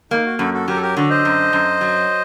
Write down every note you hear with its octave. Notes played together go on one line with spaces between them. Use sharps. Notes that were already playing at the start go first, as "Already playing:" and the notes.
A#3 D#4
F#4
F#2 F#4 A4
F#4 A4
F#3 G4 A#4
A4
G4 A#4
D3 F#4
C5 D#5
F#2
F#2
F#3